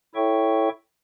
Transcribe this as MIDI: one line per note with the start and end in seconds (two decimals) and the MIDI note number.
0.15 0.69 64
0.15 0.69 69
0.15 0.69 73
0.15 0.69 76
0.15 0.69 79
0.15 0.69 85